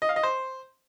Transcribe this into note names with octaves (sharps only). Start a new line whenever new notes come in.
D#5
F5
D#5
C5